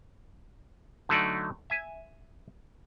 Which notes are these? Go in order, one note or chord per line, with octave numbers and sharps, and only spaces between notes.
D3 F#3 A3 D#4 D5
E5 G#5